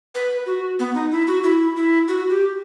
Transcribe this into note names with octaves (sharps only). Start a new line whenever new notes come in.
B4
F#4
B3
D#4
E4
F#4
E4
E4
F#4
G4